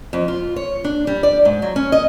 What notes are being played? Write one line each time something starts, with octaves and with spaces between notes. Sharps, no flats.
F2
F4
C#5
D4
G3
D5
G#2
F#3
C#4
D#5